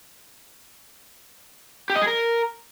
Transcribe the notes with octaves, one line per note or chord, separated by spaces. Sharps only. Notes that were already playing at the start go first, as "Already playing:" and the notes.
G4
D#5
G#4
A#4